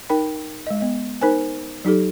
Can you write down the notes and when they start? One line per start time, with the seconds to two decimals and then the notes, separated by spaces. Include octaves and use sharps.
0.10 D#4 A#4 G5 B5
0.67 G#3 D#5
0.81 B3 D#5
1.21 D#4 A#4 C5 G#5
1.85 F#3 D#4 G4 A4